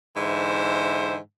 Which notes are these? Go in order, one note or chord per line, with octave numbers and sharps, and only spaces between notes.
G#2 D3 E3 G#3 C5 E5